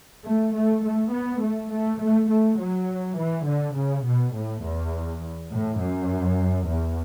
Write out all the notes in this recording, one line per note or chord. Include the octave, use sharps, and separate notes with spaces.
A3
A3
A3
B3
A3
A3
A3
A3
F#3
E3
D3
C#3
B2
A2
E2
A2
F#2
E2